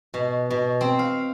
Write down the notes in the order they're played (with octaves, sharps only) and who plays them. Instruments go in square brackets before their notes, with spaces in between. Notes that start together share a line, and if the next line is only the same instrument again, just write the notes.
[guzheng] B2
B2
C4
F5